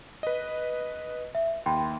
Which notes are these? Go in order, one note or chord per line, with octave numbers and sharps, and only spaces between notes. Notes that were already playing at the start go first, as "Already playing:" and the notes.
B4 D#5
E5
D#2 G5 B5 C6